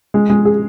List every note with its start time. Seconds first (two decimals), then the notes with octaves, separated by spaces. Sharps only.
0.14 G#3
0.30 G#3
0.45 G#4